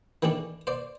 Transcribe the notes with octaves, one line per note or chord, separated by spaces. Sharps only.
D#3 E3 A3 D4 A4
C5 D5